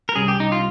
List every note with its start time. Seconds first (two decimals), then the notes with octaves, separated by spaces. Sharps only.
0.09 A#4
0.16 C2 C3 G3 C#4 G#4
0.28 G4
0.40 D#4
0.52 F4